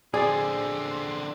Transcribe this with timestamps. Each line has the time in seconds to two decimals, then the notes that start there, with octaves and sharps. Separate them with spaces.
0.14 D3 C4 G#4 D5 D#6